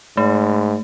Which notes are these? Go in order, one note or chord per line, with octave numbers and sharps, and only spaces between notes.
G#2 A3